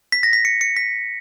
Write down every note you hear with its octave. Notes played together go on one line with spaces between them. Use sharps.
B6
A#6
B6
C#7
C#7
B6